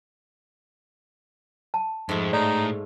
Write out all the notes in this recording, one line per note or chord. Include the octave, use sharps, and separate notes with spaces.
A5
F2 G#2 A3
A2 D#4 D5